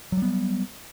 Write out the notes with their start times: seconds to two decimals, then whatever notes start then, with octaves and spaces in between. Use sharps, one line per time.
0.12 F#3
0.17 G3
0.22 B3